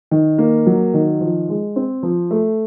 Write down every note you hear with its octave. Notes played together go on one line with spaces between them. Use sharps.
D#3
A#3
F#3
D#3
F3
G#3
C4
F3
A3